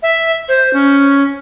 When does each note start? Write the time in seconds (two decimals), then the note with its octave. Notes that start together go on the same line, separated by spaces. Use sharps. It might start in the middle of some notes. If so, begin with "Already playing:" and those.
0.03 E5
0.48 C5
0.73 C#4